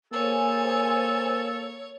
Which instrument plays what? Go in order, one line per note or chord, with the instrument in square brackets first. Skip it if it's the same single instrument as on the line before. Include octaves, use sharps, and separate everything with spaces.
[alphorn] A#3 [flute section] G#4 C5 G#5 [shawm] A4 [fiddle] C#5